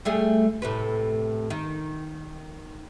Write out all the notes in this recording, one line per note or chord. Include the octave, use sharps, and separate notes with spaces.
G3 A3 G#4
A2 C3 B4
D#3